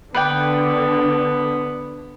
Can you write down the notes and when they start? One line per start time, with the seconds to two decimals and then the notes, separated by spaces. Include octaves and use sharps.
0.14 D3 B3 B4 D5 G5